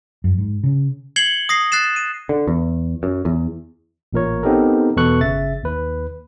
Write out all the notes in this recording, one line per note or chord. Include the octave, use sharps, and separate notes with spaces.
F#2
G#2
C#3
G#6 C7 C#7 F#7 G7
D#6 A#6 C7
F#6 A6 C7 E7
D#7
D3
E2
F#2
E2
A1 A#2 A#4 C#5
B3 C4 D#4 G4 A4 A#4
E2 B2 A4 B4 C#6 F#6
G1 C#3 E5 A6
D#2 B4